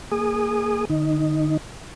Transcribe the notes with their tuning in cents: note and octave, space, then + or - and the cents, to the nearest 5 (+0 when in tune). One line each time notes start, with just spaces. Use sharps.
A#3 -15 G#4 +0 D#6 -25
D3 +45 D#4 +0